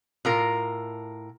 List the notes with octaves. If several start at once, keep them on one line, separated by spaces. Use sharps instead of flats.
A2 F4 A#4